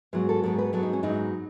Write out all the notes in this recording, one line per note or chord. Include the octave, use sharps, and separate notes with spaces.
G#2 F#3 B3 B4
A4
G#2 F#3 B3 A4
B4
G#2 F#3 B3 A4
D#4
C#4
G#2 F#3 B3 D#4